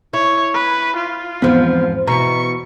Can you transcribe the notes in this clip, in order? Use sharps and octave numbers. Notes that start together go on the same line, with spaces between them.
E4 C#5
B4
F4
E2 G#2 F3 B3 C4
E2 B2 A#5 C#6 C#7